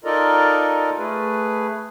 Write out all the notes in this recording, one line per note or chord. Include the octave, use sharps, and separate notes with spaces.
D#4 F4 A4 A#4 D5 D#5
A3 G#4 B4